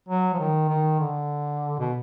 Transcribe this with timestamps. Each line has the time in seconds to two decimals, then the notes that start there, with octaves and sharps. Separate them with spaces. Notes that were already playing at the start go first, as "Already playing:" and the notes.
0.09 F#3
0.34 F3
0.39 D#3
0.69 D#3
0.99 D3
1.79 B2